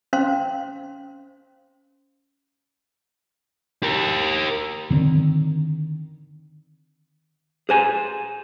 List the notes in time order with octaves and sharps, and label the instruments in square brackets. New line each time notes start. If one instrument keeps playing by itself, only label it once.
[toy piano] C#4 C5 F5 C6
[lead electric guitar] G4 A#4
[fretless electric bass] D3 D#3 C4
[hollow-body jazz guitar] G#4 C5 G#5